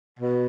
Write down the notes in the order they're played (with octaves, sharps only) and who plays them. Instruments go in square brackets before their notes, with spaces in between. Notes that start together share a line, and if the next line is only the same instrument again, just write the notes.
[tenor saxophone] B2